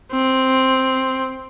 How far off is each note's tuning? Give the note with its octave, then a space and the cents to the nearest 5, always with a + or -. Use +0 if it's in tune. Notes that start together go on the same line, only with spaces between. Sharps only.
C4 +5